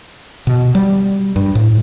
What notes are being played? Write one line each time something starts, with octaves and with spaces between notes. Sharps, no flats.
B2
G3
G2
A2